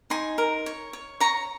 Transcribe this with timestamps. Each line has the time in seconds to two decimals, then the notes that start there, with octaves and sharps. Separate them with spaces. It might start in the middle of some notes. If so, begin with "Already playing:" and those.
0.10 D#4 G#5 C6
0.38 A#4
0.66 C#5
0.93 C#5
1.20 C#5 A#5 C#6